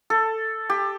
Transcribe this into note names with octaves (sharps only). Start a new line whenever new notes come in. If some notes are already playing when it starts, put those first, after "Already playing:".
A4
G4